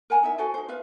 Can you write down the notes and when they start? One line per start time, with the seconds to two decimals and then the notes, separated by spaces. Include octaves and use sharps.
0.10 A#4 F#5 G#5 A#5
0.23 D#4 E4 E5
0.38 F#4 A4 C5 G#5
0.54 D#4 C5
0.68 F4 B4 E5 F5